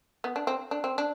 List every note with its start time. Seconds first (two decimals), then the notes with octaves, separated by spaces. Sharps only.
0.24 B3
0.36 D4
0.47 C4
0.71 D4
0.84 C4
0.98 D4